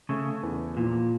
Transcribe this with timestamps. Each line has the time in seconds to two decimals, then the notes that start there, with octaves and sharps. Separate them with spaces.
0.09 C#3 A3
0.43 E2
0.77 A#2 F3